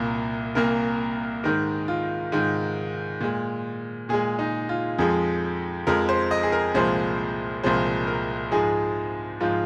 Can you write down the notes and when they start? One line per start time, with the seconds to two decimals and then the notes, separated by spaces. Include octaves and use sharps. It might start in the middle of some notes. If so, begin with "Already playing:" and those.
Already playing: C2 A#2 A#3
0.55 C2 A#2 A#3 A#4
1.44 G#2 D#3 G#3 A#4
1.88 F4
2.32 G#2 D#3 G#3
3.20 A#2 G#3
4.09 A#2 G#3 G#4
4.39 D#4
4.69 F4
4.99 F2 F3 G#3 G#4
5.87 F2 F3 G#3 A#4
6.09 C5
6.31 D#5
6.43 G#4
6.52 A#4
6.74 C2 A#2 F3 G#3 C5
7.63 C2 A#2 F3 G#3 C5
8.07 A#4
8.51 G#2 F3 G#3 G#4
9.40 G#2 F3 G#3 F4